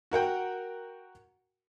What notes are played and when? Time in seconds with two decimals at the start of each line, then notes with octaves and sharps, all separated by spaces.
0.11 F#4 A#4 F#5 G5